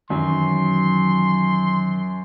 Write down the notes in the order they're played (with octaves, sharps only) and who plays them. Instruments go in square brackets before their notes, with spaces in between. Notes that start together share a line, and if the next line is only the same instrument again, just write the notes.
[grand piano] F#2 [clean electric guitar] D#3 E3 F#3 [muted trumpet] C6